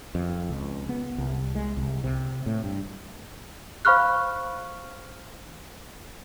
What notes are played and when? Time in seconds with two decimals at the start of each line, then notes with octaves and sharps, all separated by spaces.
0.15 F2
0.50 C#2
0.89 B3
1.18 C2
1.55 G#3
1.77 C2
2.04 C3
2.46 A2
2.64 G2
3.85 C5 F5 B5 C#6 F6 F#6